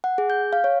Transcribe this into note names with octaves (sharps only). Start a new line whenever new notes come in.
F#5
G#4
G6
F5
C#5